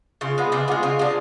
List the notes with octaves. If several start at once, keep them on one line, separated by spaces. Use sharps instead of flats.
C#3 F4
G#3 B3
C#3 D4
G#3 B3 F4
C#3 F4
G#3 D4